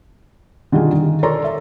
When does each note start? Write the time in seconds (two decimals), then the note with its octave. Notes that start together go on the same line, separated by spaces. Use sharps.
0.72 D3 D#3 G3 F4 G#4
0.92 D#3
1.23 A4 A#4 C#5 D5 A#5 C6
1.44 E5